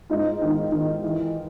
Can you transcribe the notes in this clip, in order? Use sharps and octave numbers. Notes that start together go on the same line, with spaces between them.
G#2 D#4 F4
D#3
D#3
E3